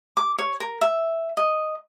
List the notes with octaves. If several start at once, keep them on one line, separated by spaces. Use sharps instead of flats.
D6
C#5
A#4
E5
D#5